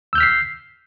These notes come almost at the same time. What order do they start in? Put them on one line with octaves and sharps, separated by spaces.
E6 G6 F6 B6 C7